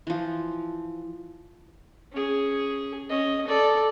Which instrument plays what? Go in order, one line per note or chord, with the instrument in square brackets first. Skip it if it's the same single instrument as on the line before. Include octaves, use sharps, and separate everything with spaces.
[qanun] E3 F3
[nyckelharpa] C#4 G#4
C#4 D#5
A4 D5